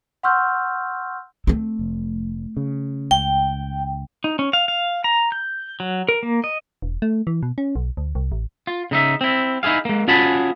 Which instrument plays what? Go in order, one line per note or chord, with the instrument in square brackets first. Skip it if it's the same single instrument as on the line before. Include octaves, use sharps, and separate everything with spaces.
[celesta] F#5 C6 C#6 E6 F6 G6
[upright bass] A3 C4
[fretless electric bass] F1
C#3
[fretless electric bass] C#2 [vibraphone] G5
[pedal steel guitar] D#4
C#4
F5
F5
A#5
G6
F#3
A#4
A#3
D#5
[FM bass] E1
A3
E3
B2
C#4
B1
D2
C2
A1
[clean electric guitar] F4
C#3 D#4 E5
C4 E4
D#4 E4 F#4 G#4 F5
G#3 A#3
C#4 F4 F#4 G#4 A5 B5